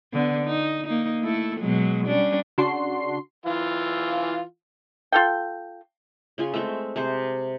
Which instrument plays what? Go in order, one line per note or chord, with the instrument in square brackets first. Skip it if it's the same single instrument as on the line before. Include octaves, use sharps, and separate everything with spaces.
[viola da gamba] D3 B3
D#4
A#3 D#4
A3 E4 A4
B2 F#3 G#3
G3 C#4 D4
[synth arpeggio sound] C#3 D4 F#4 C6 C7
[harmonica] E3 F4 F5
[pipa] F4 A4 G5
[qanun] C#3 F4 G#4 G#5
G#3 A3 C4 E5
C3 G#4 C5